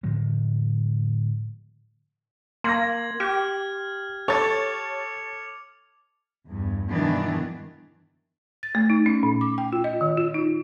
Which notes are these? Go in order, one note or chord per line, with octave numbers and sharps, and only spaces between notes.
A2 D3 F3 G#3
A#3 C6 G#6 A#6 F#7
G4 F6
A4 C#5 D6 A6 C#7 F7
E2 G2
G2 B2 D#3 E3 B3 D4
A6
A3
D#4
C#4
A#2
D6
G5
F4
D#5
D#3
F4
D#4